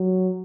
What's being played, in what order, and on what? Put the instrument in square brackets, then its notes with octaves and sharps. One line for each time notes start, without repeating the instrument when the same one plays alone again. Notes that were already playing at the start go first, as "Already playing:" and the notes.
Already playing: [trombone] F#3